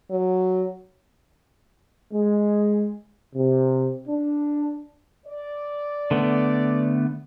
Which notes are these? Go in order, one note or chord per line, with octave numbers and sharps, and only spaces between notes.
F#3
G#3
C3
D4
D5
D3 A3 B3